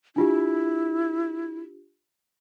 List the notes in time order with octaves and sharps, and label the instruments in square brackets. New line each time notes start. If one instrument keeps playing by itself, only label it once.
[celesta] D4 F4 G4 [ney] E4